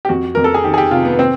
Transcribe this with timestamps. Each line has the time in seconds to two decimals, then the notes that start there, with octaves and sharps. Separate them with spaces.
0.05 G4
0.09 F2 F#4
0.35 F2 A#4
0.44 A4
0.54 G#4
0.64 D#3 G4
0.74 G#4
0.78 G4
0.91 C3 F4
1.05 B3
1.19 C4